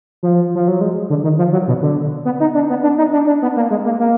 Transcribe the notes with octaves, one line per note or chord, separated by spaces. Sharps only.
F3
F3
F#3
G#3
D3
D#3
F3
F#3
B2
D3
B3
D#4
D4
B3
D4
D#4
D4
D4
B3
A#3
G#3
A#3
A#3